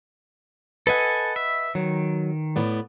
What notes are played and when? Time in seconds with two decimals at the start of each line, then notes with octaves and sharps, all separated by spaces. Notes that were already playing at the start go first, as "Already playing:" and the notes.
0.87 A4 B4 D#5 F#5 G#5
1.36 E5
1.75 D#3 F#3
2.56 A2 B3 D5